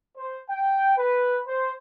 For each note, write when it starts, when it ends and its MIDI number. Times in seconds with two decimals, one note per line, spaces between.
0.17 0.39 72
0.49 0.93 79
0.98 1.39 71
1.48 1.73 72